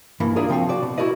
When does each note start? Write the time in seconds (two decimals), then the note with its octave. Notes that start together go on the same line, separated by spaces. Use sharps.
0.20 C2 G2 E3 A#3 E4
0.36 D4 E4 F4 G#4 A#4 D5
0.49 C3 F3 C4 F4 F#4
0.69 F#4 D5
0.83 B2
0.98 G#3 E4 F#4 A#4 D5 D#5